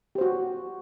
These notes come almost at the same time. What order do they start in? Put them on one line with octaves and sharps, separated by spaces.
G4 C5 F#4